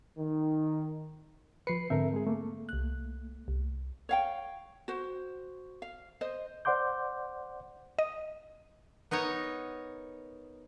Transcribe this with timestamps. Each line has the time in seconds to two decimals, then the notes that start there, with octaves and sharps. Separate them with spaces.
0.18 D#3
1.67 F3 B4 C7 C#7
1.90 G#2 D3 C4 A4 A#4 E5
2.13 G#3 G#4
2.27 A3 A#3
2.69 C2 F#6
3.48 C2
4.09 C#5 F5 G5
4.88 F#4 C5
5.82 F5
6.21 C5 D#5
6.65 C5 D5 F#5 C6 D6 G6
7.99 D#5
9.11 B3 D#4 A#4 C#5